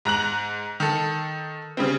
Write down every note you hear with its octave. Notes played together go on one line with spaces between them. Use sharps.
G#2 A#5 F#6 F#7
D#3 A4
C#3 G3 C4